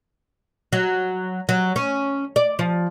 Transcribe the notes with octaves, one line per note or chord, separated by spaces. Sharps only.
F#3
F#3
C#4
D5
F3